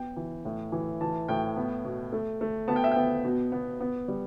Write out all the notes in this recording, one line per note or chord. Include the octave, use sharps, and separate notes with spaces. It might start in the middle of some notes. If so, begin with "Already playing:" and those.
Already playing: B3 G5
E3
A2
E3
E3 A5
A2 G5
B3
B2
A3
A3
B3 A5
G5
E5
B3 G5
B2
B3
B3
G3